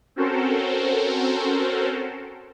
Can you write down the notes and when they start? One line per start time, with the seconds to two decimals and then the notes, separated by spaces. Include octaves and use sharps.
0.16 C4 C#4 F#4 A4 A#4 C5